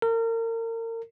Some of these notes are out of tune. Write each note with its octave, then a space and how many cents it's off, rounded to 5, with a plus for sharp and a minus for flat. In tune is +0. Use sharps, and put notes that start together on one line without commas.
A#4 -35